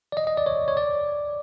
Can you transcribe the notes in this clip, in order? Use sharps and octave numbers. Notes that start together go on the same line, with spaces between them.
D5
D#5
D#5
D5
C#5
C#5
D5